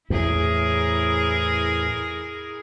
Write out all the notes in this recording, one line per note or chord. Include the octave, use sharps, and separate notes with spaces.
E2 A2 E4 G#4 A#4